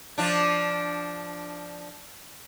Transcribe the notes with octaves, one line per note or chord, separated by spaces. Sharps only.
F3 D4